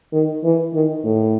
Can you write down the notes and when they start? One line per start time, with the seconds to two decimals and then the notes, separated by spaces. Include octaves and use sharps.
0.13 D#3
0.44 E3
0.74 D#3
1.04 A2